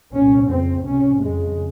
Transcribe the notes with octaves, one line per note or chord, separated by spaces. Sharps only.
C2 A#2 C#4
F2 C#3 C4
C#2 C3 C#4
F2 C#3 G#3